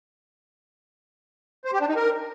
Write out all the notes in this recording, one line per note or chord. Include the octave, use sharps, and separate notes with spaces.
C5
G4
D4
D#4
A#4